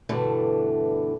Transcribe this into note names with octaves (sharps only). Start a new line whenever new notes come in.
G2 B2 D3 E3 A3